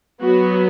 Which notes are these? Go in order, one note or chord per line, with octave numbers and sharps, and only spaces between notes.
F#3 B3 F#4